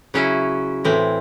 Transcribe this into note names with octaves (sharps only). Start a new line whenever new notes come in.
C#3 F#3 C#4 E4
A2 E3 C4